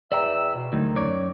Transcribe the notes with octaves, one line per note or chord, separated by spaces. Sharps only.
E2 D5 E5 G5 A#5 E6
B2
D2 D#3 F#3 D#4
F#2 C#5 D5